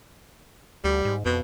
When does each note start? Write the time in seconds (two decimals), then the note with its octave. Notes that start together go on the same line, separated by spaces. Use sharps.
0.84 D2 G3
1.05 G#2
1.26 F2 B2